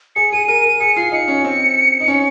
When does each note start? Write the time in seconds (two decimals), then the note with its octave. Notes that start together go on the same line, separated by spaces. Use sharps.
0.16 G#4 C#7
0.32 G#4 D#7
0.48 A#4 D#7
0.64 A#4
0.80 G#4 C#7
0.96 F4 C7
1.12 D#4 C#7
1.28 C#4
1.44 C4
2.00 D#4
2.08 C#4